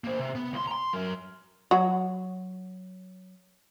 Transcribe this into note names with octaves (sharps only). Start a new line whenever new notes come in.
A#3 C5
C3
B3
C#2 C6
A#5 C6
F#3 A#4
F#3 F#4